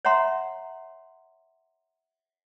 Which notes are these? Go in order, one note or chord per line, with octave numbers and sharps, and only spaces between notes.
C#5 E5 F#5 A#5 C6